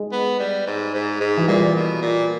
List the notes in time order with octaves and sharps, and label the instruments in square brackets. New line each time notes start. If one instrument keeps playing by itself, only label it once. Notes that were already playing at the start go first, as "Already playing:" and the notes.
Already playing: [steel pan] G#3
[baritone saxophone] B3
G3
G#2
G#2
G#2
[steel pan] E3
[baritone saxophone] A#2 [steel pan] G3
[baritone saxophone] B2
A#2